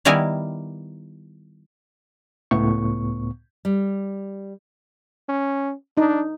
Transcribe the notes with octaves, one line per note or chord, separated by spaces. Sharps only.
D#3 G3 B3 E4 A#4 G#5
C#2 A2 B3 C#6
G3
C#4
D4 D#4